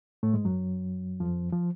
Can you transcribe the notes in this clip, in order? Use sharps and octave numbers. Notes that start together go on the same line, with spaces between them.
A2 A3
G#2 G#3
F#2 F#3
F2 F3
F3